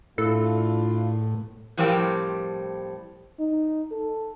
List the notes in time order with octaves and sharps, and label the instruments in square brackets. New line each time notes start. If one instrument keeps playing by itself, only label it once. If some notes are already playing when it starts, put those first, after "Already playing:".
[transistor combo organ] A2 [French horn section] A3 D4 F4 [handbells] E4 [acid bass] A4
[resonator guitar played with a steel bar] A2 F3 G3 C4 A#4 G5
[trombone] D#4
A4